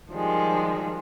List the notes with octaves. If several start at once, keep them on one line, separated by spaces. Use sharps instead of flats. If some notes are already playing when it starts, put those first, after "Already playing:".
D#3 F3 G3 G#3